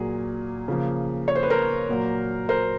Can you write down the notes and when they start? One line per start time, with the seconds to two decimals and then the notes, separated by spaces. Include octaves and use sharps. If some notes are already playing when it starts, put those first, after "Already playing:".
Already playing: A#2 F#3 A#3 G#4
0.68 C#3 F3 A#3
1.28 C#5
1.35 C5
1.43 B4
1.50 A#4 C5
1.89 A#2 F#3 A#3
2.49 A#4 C5